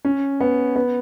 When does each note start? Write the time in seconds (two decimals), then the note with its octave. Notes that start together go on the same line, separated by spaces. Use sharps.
0.05 C#4
0.41 B3
0.76 B3